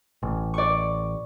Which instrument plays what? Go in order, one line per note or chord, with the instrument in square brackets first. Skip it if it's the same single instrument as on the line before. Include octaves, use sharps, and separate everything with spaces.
[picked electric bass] A1
[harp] D5 C#6